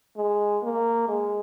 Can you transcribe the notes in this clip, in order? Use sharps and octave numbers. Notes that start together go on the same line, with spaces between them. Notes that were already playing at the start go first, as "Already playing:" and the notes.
G#3
A#3
G#3